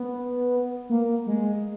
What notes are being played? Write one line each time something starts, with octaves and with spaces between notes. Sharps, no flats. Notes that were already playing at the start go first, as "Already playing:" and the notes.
Already playing: B3
A#3
G#3